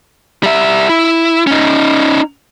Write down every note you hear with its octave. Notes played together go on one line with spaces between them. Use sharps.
G3 E5
E4
C#4 D#4